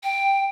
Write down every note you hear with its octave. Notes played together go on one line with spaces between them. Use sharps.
G5